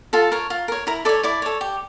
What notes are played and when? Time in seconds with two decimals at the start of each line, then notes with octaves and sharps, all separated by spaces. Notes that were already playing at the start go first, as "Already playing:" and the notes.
0.13 F4 A4 A5
0.32 A#4 C#5
0.50 F4
0.68 A#4 C#5
0.87 E4 A#4 A#5
1.05 A4 D5 D6
1.09 C#5
1.23 E4 D5 D6
1.42 A4 C#5
1.61 G4